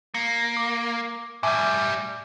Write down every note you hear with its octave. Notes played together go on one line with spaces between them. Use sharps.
A#3 C#7
D6
A2 G3 E5 G#5 D6